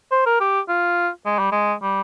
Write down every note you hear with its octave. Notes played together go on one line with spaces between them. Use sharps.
C5
A#4
G4
F4
G#3
G3
G#3
G3